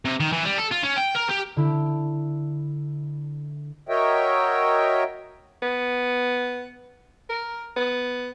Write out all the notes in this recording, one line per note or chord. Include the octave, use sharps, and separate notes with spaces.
C3
D#3
E3
G3
A4
F4
C#4
G5
A#4
G4
D3 E4
F#4 A#4 C#5 D#5 E5 G5
B3
A#4
B3